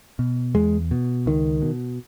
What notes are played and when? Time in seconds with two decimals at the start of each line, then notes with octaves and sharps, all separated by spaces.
0.19 B2
0.55 E2 G#3
0.91 B2
1.26 C#2 D#3
1.62 B2